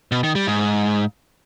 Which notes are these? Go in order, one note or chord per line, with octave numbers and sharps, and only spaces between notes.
B2
D#3
G3
G#2